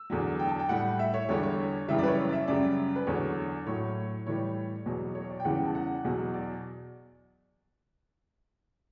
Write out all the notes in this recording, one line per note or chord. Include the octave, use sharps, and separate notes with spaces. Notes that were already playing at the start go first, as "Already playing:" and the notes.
Already playing: E6
E2 D3 F#3
G5
A5
G5
A2 G3 F#5
E5
C#5
E2 D3 G3 C#5
C#5
F#2 C#3 E3 G3 E5
D5
B4
C#5
D5
E5
F#2 C#3 G3 D5
B4
E2 D3 F#3 C#5
A2 F#3 C#5
A2 E3 G3 C#5
E2 B2 F#3
C#5
D5
G5
E2 C#3 E3 G3 F#5
G5
A5
F#5
E2 B2 F#3
D5